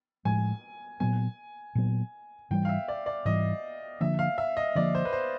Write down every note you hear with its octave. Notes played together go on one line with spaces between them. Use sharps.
A2 F3 G#3 G#5
A#2 F#3 B3 G#5
A#2 F#3 B3
G#2 E3 G3 G5
F5
E5
D5
D5
G#2 E3 G3 D#5
D3 F3 A#3 E5
F5
E5
D#5
D3 F3 A#3 D5
C5
B4
C5